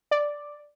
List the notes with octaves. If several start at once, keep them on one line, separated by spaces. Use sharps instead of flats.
D5